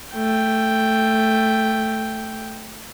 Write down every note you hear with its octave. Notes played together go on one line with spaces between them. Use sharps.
A3 G5